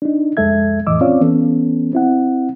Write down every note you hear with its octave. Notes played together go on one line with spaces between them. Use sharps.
D4 D#4
C2 F2 G#3 A4 E5 G#6
F2 A2 E3 D#5 D6 E6
C4 C#4 F4 C#5 D5 F5
E3 B3 C#4 A4
C4 E4 F#5